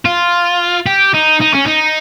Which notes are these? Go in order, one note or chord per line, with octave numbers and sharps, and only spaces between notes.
F4
G4
D#4
D#4
C#4
D#4